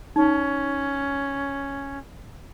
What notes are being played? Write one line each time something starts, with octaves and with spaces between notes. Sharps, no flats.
C#4 D#4